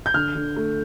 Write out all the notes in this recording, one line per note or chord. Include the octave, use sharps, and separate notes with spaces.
G6
D3 F6
D3
A3